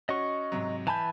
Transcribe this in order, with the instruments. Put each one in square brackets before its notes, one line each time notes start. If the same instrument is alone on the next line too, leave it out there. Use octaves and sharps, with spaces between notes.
[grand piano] C#4 F#4 C#5 [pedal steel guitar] D#5 C#6
[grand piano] G#2 C3 F#3
[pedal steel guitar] E3 A5 B5 [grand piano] G#5 G6